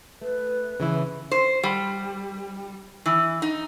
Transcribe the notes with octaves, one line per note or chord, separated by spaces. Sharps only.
A3 B4
C#3 E3 E4
C5
G3
E3
D#4